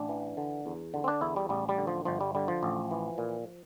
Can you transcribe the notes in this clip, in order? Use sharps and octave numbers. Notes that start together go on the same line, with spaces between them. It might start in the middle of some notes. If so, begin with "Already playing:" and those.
Already playing: A1 D4
E3
D3
E2
D3
C4
D4
E2 E4
G3
A1 G3
G3
D3
F3
G1 F3
G3
D3 G3
F3
A1
E3
A#2